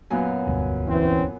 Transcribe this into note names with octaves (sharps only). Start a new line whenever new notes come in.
F#2 A#2 B3 F5 G#5
E1 D2 G2
E3 C4 C#4